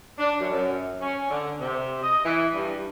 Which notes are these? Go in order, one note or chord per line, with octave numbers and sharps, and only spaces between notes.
D4
F#2
F#2
C#4
D3
C3
D#5
E3
G2